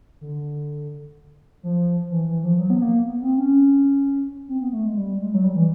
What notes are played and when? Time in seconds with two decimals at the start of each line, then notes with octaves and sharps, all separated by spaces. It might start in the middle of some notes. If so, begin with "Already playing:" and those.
0.21 D3
1.63 F3
2.10 E3
2.27 E3
2.43 F3
2.59 F#3
2.70 B3
2.82 A#3
3.06 B3
3.22 C4
3.38 C#4
4.49 C4
4.61 B3
4.73 A3
4.85 G#3
4.96 G3
5.20 G#3
5.34 F#3
5.44 G3
5.55 E3